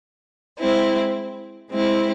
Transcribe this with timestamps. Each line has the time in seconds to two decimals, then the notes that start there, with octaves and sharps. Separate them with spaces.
0.59 G#3 C4 E4
1.71 G#3 C4 E4